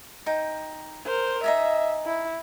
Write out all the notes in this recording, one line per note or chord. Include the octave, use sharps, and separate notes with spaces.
D#4 G5
A#4 C5
D#4 D#5 E5 G#5
E4